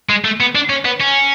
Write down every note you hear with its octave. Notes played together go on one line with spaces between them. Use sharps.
G#3
A3
B3
D4
C#4
B3
C#4